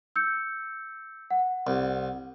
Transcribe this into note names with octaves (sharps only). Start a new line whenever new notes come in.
E6 G6 C#7
F#5
C2